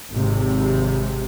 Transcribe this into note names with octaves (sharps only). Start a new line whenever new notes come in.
G#1 G#2 C3